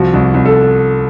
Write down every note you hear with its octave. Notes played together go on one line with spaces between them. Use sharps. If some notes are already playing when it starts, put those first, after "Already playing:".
Already playing: C2 F3 F#4
C2
C2
A4